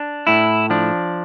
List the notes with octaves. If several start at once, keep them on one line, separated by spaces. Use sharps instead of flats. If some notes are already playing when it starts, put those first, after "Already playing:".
Already playing: D4
A2 E4
F3 D4